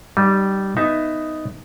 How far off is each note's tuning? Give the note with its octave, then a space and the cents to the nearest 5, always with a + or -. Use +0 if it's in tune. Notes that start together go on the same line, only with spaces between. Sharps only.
G3 -15 D#4 -35
B3 +10 D#4 +0 E5 +5